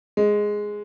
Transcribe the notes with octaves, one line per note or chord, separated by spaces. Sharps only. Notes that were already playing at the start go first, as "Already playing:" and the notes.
G#3